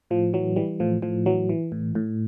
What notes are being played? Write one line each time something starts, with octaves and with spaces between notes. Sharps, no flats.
A2 F3
E3 F#3
E3 G3
A2 F3
A2 F3
E3 F#3
E3
A2
A2